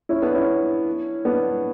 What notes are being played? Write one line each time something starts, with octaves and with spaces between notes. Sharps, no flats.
C#4 E4
B3 D4
C#4 E4
B3 D4